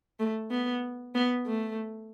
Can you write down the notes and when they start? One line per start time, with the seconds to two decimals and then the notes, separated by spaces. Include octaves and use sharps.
0.20 A3
0.51 B3
1.15 B3
1.46 A3